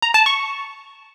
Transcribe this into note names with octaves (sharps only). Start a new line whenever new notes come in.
A#5
A5
C#6